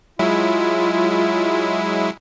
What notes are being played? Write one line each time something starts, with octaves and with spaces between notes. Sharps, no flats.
F#3 G#3 E4 F4